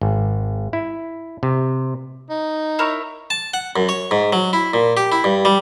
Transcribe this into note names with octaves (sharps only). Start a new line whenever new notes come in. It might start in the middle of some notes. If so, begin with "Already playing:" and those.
G#1
E4
C3
D#4
E4 A#4 C#5
A5
F#5
F#2
C#5
G#2
F#3
E4
A#2
G4
E4
G2
G3